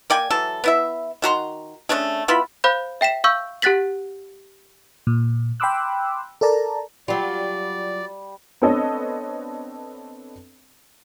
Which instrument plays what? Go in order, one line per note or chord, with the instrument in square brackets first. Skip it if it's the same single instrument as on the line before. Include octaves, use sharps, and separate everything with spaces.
[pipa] A#3 D5 G5 G#5
E3 F#3 A4
B3 E4 E5
D#3 F#4 A#5 C6
A3 C#4 D4 G#4
B3 E4 F4 B5
[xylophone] C5 F5 B5 G6
E5 G5 B6 E7
F5 C#6 E6 G6
G4 F#5 F#6 A6 B6 F#7
[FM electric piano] A#2
G5 B5 C6 D6 E6 F#6
A4 A#4 D5 A5 A#5
[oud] F#3 F4 [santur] G3 G5 A5 [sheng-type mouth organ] D5
[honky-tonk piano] B3 C4 D4 A4 C#5 D#5